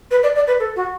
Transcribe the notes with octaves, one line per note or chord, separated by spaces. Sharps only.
B4
D5
D5
B4
A4
F#4